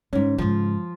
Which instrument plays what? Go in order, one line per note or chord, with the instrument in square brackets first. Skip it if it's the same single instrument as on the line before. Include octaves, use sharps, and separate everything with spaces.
[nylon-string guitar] G#2 C#4 [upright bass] D3
[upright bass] G#2 C#3 [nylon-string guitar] F3